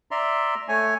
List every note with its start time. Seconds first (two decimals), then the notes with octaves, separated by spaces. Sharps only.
0.11 D5 E5 A#5 C6
0.69 A3 C#5 G#5